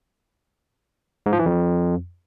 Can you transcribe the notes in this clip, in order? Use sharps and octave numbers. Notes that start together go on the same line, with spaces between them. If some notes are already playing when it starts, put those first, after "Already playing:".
G#2
F3
E3
F2